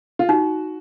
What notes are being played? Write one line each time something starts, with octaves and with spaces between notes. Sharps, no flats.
F4
D#4 F#4